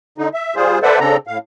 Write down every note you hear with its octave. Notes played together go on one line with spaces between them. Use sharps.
D3 D#4
E5
G3 F4 G#4 C5
A4 B4 C5 D5 E5 F#5
C#3 C4 D4 A4 A#5
A2 F5